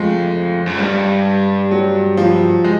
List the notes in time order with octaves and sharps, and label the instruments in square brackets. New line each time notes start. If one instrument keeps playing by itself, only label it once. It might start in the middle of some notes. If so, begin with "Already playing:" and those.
Already playing: [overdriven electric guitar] F2 [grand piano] G#3 A3
[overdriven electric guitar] F#2
[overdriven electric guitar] G2 [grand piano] G3
[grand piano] F#3
F3
G#3